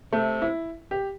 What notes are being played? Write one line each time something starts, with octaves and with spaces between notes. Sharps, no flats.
C3 A3
E4
G4